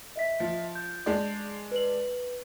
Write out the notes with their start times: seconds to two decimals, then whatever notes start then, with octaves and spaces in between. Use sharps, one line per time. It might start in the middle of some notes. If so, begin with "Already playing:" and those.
0.16 D#5 E5 B6
0.40 F3
0.75 G6
1.06 G#3 D4 D5
1.72 B4 F#7